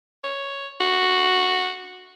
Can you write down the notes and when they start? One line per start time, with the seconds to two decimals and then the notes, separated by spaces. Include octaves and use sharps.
0.24 C#5
0.81 F#4